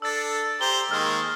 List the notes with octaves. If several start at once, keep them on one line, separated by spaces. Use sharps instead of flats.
D4 A4 E6 A6
G4 C5 A#5 G7
D#3 G#3 A#3 F6